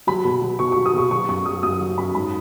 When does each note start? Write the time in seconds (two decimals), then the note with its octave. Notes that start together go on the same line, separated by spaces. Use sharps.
0.07 F#3 B5
0.25 B2
0.42 F#3
0.59 B2 C#6
0.72 F#3 C#6
0.86 D#6
0.94 B2 C#6
1.11 F#3 C#6
1.28 F#2 C#6
1.46 F#3 D#6
1.63 F#2 D#6
1.80 F#3
1.98 F#2 B5
2.15 G#2 B5